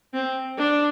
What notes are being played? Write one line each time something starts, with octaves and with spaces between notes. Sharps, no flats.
C4
D4